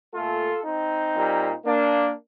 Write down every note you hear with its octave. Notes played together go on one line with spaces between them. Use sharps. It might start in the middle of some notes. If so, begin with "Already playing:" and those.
A#2 A3 F4 A4
C4 D#4
A#2 G3 A#3
A#3 D4